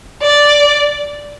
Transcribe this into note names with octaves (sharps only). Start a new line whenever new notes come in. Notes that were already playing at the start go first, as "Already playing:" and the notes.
D5